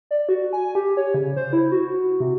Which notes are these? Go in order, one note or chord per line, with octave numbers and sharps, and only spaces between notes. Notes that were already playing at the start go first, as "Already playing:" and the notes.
D5
F#4
G#5
G4
C#5
C#3
C5
E4
F#4
C3